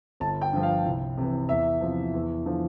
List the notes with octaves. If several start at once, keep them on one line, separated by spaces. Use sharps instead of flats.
G1 A5
G5
G2 F3
F5
C2
C3 E3
E2 E5
C3 F3
E2
D3 F3